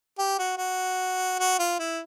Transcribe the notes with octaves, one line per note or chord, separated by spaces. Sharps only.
G4
F#4
F#4
F#4
F4
E4